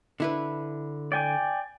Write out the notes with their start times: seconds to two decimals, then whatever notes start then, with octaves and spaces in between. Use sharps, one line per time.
0.20 D3 E4 B4
1.12 D5 G5 G#5